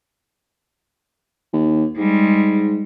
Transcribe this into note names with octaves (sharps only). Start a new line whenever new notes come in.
D#2
G#2 G3 G#3